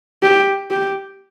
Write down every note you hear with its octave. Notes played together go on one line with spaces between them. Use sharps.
G4
G4